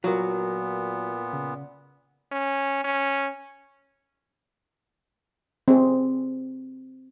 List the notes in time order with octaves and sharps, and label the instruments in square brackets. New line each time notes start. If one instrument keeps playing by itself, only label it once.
[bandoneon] A#2 B3 [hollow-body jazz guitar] F#3 [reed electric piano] F4 A#4
[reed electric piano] C#3
[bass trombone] C#4
C#4
[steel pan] C4 G#4